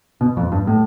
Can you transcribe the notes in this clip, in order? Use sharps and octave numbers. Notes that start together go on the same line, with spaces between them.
B2
F2
G2
A2